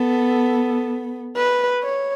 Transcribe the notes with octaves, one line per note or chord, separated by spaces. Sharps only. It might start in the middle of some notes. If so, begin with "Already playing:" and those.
Already playing: B3 A4
B4
C#5